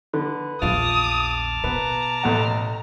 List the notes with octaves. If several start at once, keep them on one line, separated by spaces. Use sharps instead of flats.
D3 B4
A#1 E2 F4 A5 D6 D#6 F6
B2 B3 A#5
A1 A3 F#5